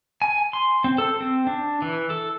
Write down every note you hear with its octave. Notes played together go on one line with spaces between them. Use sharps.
G#5
C6
C4
A4
C4
D4
E3
A4